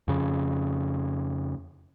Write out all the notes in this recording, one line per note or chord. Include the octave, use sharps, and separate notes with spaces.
F2 C#3